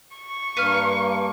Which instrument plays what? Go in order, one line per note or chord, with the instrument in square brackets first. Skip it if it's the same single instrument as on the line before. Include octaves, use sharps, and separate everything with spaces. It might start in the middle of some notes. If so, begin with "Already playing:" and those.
[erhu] C#6
[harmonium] G2 A#3 [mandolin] B4 F6